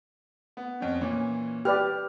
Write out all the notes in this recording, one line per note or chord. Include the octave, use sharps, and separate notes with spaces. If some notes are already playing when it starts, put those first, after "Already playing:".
B3
F2 C#4
A#2 E3 C#4
G4 B4 D5 F6